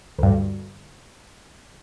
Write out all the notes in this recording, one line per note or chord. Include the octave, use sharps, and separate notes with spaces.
D2 G2